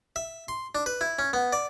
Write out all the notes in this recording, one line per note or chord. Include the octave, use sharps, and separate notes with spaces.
E5
C6
D4
B4
E4
C#4
B3
D5